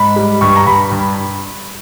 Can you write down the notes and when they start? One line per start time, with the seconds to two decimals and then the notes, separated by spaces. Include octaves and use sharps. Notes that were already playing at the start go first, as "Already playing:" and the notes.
Already playing: G#2 B5
0.16 G3
0.41 G2 C#6
0.56 A#5
0.66 G2 B5
0.91 G2